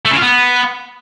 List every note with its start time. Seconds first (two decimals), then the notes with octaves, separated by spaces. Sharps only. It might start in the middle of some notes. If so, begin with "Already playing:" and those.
0.05 A3
0.11 C#3
0.17 F4
0.22 B3